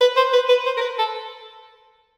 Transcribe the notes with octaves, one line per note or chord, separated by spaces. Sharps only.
B4
C5
B4
B4
C5
A#4
B4
A4